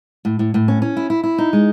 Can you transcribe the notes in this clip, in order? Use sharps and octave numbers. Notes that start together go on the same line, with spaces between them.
A2
A2
A2
C#4
C#4
E4
E4
E4
D#4
G#3